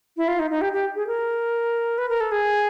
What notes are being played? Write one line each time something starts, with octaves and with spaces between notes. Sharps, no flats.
E4
F4
D#4
D#4
G4
G4
G#4
A#4
B4
A#4
A4
G#4